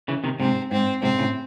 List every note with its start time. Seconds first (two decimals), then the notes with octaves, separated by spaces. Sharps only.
0.08 C#3 E3
0.24 C3 D#3
0.40 G#2 C3 C4
0.71 G#2 C4
1.03 G#2 C3 C4
1.18 A2 C#3